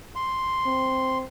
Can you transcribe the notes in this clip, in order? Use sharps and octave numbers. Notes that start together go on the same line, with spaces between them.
C6
C4